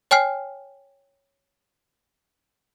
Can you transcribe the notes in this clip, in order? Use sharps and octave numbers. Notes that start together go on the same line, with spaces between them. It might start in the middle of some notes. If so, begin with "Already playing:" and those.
C#5 G5 G#5 F6 C7